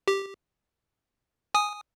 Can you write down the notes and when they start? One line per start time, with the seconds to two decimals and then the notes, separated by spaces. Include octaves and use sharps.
0.08 G4
1.54 G#5 D#6